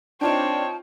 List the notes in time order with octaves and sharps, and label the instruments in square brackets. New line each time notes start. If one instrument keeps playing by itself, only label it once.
[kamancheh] C4 C#5 [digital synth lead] D4 [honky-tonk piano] D#4 F4 G5 [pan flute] A5